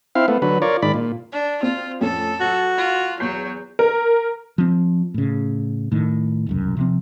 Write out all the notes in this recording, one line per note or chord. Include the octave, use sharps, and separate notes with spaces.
C4 E4 F5
A3 B3
D3 F#3 B4
F4 A#4 C#5 D5
G#2 D#3 D5 B5
A#2
D4
C4 F4
F2 A2 C#4 A4
F#3 F#4
F4
E2 F#3 G6 C7
A#4
F3 C4
A2 C#3
A2 D#3
E1 C2 F#2
C3 F3 C4